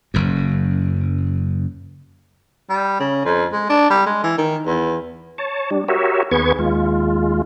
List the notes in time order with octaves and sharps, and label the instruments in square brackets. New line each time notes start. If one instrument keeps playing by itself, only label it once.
[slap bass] F#1 F#2
[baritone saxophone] G3
C#3
F2
G#3
D4
G3
G#3
E3
D#3
E2
[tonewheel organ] C#5 A5
G3 D4
F#4 G4 A#4 C#5 E5
D#2 B3 G#4 B4 C#6 G#6
D#2 G#3 F4